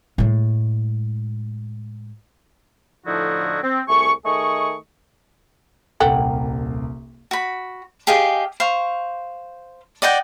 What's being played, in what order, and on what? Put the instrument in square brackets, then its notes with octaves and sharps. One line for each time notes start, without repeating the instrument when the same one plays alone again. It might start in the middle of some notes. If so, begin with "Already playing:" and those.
[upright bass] A2 G#3
[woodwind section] A2 D3 F3 D#4 E4 F#4
C4
C2 A3 G#4 C#6
D#3 A3 G#4 D#5 C#6
[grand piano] D#1 C2 A#3 [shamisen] A4 F#5 G5
[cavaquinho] F#4 B5
G4 G#4 D#5 F5
C5 F5 C#6
D5 D#5 F#5 G5